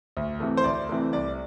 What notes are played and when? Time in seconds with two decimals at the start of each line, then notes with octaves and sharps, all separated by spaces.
0.17 D2
0.40 C3 E3 A3
0.57 C5
0.64 D2 D5
0.89 C3 E3 A3
1.13 C2 D5